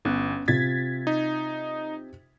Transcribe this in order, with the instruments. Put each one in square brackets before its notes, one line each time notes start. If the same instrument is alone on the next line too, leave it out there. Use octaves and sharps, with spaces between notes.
[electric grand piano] G1 [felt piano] B3 C#4 F#6
[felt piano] C3 F4 [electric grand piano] G#6 A6 B6
[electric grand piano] D#4